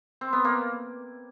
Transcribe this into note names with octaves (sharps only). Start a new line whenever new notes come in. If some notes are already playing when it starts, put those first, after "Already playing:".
C4
B3
A#3